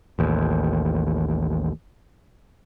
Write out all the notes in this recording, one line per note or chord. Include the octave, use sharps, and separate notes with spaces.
A1 D#2